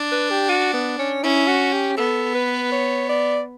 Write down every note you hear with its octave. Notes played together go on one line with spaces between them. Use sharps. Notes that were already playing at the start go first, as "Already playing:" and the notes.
Already playing: D4
B4
G4
F#4
B3
C#4
C#4 E4
F#4
G4
B3 A4
B4
C#5
D5